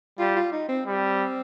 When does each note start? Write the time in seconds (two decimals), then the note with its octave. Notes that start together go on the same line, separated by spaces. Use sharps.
0.19 G3 F4
0.36 F4
0.53 D#4
0.69 C4
0.86 G3 C4